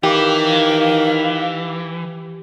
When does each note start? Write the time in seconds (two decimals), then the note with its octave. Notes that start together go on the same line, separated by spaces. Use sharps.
0.03 D#3 E3 G4 F5